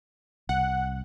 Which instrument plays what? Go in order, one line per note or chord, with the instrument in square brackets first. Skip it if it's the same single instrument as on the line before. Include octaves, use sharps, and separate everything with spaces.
[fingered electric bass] C2 [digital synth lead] F#5